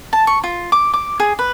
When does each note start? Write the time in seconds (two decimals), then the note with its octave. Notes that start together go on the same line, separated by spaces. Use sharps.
0.13 A5
0.27 C#6
0.44 F4
0.72 D6
0.94 D6
1.20 G#4
1.39 B4